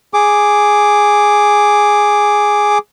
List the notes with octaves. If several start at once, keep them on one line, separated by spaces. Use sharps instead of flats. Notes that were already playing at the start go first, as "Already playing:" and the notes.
G#4 D6